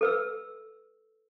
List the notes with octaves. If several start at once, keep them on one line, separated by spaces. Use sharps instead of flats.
A4 B4 E6